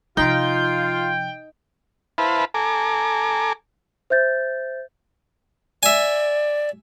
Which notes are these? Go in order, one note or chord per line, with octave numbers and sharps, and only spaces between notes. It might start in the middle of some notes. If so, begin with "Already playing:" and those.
C3 F3 D#4 F4 G5
E4 B4 C5 F5 A5 B5
A4 G#5 A#5 D6
C5 E5 G6 A6
D5 E5 G#5